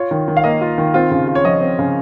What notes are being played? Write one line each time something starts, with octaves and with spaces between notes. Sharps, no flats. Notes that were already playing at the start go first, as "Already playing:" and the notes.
Already playing: F4 C#5
D#3
D#3
F5
A#3 D#5
F4
D#3
C4 F4
C#3
F4
C#5
F3 D#5
C4
C#3